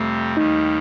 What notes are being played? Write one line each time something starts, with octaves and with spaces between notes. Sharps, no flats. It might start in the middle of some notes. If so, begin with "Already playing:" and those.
Already playing: F2 C3 G3 A3 C4
D#2 D#3 G3 D#4